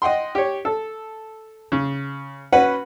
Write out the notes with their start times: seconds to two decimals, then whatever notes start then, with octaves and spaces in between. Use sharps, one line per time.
0.02 D#5 F#5 G5 C6
0.35 G4 C#5
0.65 A4
1.72 C#3
2.52 C#4 F#4 B4 F#5 B5